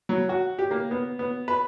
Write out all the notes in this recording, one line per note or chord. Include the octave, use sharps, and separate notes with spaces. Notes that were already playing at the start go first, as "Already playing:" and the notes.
F#3
F#4
G4
A#3
B3
B3
B4